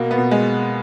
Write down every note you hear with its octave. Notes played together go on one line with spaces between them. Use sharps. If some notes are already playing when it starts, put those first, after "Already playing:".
Already playing: B2 A#3
B3
B2
G#3